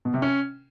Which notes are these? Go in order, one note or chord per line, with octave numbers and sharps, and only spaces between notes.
B2
C3
C#4